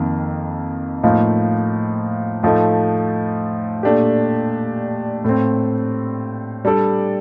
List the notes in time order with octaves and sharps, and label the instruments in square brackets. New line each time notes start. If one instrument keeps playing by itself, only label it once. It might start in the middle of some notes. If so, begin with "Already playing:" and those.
Already playing: [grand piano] F2 D#3 A#3
A2 F3 A#3 D#4
A2 F3 A3 D#4
A#2 A3 D4 G4
A2 A3 C4
G3 D4 A4 D5